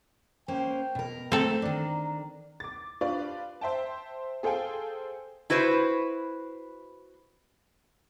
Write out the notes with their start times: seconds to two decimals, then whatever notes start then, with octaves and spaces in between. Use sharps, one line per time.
0.48 A#3 C#4 C5 G5
0.95 B2 A#4
1.32 A3 C4 A4 A#5
1.62 D#3 D4
2.60 D6 A6
3.01 D4 F4 G4 B4 D5
3.61 C5 E5 G5 A5
4.43 G#4 A4 C5 F5 G5 G#5
5.50 E4 F#4 B4 C5